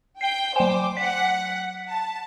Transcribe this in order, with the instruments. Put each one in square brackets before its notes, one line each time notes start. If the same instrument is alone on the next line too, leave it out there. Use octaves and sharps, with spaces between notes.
[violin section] G5 [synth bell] C7 G7
[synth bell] F#3 G5 G#5 [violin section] C5 D6
[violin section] F#5 [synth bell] B6
[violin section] A5